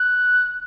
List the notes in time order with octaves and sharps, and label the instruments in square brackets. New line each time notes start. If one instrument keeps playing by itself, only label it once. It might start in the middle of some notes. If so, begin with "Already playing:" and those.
Already playing: [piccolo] F#6